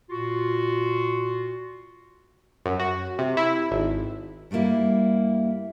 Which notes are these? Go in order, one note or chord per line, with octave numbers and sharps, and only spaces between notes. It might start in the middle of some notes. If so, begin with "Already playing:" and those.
A#2 F4 F#4
F#2
F#4
C3
E4
G#1
G2 G3 A3 A#3 E4